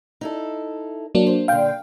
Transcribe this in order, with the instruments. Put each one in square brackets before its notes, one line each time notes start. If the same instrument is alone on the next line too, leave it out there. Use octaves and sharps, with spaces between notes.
[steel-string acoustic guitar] D#4 E4 A4
[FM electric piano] F#3 A#3 D4
[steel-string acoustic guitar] C5
[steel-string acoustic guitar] A#2 D3 [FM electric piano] F5 G5